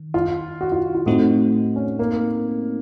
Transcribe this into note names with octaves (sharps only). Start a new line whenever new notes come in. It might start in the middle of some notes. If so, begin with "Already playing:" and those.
Already playing: D#3
F4
F#4
F4
F4
A2 A3 C4 D#4 F#4
C#4
A#3